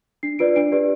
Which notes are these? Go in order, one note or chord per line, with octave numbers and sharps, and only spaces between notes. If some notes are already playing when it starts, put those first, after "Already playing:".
D4 C7
F4 B4 D5 D7
D4 D7
G4 B4 D5